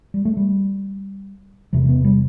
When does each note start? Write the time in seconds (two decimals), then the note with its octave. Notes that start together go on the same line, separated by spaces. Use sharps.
0.14 G3
0.25 A3
0.37 G3
1.73 E1 E2 C3 F#3
1.89 B3
2.04 G3